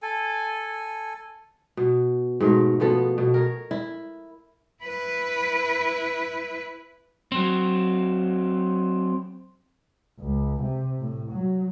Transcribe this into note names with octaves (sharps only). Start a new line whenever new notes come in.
A4 G#5
B2
G#2 B2 A3 A#4
B2 F3 B3 A4
B2
A#4 C#5
E4
E4 B4
F#3 C4
C#2
C3
A2
F#3